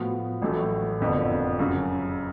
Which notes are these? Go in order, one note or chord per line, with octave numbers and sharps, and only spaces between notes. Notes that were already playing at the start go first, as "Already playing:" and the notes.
Already playing: A2 F3 B3 F#4
A1 A2 F#3 A3
F#1 F2 D3 F3 B3
F#2 C#3 F#3